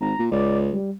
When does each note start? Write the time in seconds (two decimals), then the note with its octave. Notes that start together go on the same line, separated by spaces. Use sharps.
0.01 G#1 A#5
0.19 A#2
0.31 C#2 D5
0.72 G3